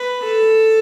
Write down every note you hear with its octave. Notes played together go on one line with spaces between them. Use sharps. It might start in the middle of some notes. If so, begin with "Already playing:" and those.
Already playing: B4
A4